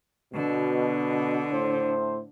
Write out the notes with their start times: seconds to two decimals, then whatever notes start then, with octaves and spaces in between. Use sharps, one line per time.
0.34 B2 D3
1.53 A2 C5